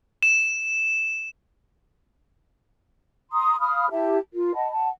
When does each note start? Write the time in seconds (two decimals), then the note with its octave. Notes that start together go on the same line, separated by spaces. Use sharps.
0.23 E7
3.32 A#5 C6 D#6
3.59 F5 B5 D#6 F6
3.91 E4 G4 E5 A5
4.32 F4 A#4
4.55 D#5 F#5 A5 B5
4.72 F#5 A5